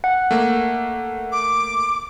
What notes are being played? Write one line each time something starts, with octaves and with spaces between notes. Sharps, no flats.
F#5
A3 A#3
D6